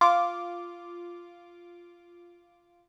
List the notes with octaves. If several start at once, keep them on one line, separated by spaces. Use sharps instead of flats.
F4 D6